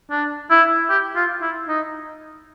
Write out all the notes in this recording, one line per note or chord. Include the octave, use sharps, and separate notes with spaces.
D4
E4
G4
F4
E4
D#4